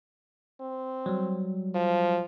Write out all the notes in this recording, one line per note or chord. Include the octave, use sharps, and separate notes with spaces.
C4
F#3 G3
F3